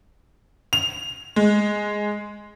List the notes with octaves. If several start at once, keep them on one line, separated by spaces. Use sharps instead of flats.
F7
G#3